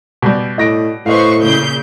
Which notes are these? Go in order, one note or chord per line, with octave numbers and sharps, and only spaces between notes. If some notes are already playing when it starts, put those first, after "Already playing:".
B2 G3
A2 D#5 A#6 D7
A2 B4 C5 D#5 F5 C#6
A#2 C#3 G6